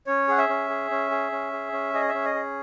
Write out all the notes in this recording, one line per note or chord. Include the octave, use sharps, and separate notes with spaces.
C#4 C#5
G#4 F#5
E5
C#4
G#4
C#4
G#4
C#4
G#4
C#4
G#4 D#5
E5
C#4
D#5
G#4